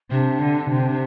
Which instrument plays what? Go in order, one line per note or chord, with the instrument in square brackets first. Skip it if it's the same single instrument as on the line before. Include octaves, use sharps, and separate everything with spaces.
[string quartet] C3 [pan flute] D4
[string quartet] D3
C3